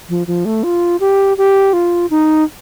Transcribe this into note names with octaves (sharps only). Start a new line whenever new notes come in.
F3
F3
A3
F4
G4
G4
F4
D#4